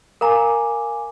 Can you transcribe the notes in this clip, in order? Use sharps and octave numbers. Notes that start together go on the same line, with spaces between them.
A#4 F5 G#5 A#5 D6